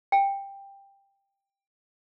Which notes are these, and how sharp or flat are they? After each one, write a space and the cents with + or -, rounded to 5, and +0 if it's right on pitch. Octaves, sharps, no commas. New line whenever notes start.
G5 +10